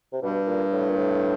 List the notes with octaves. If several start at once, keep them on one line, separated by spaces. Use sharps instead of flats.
C3
G2 B2
A#2
A2
A#2
A2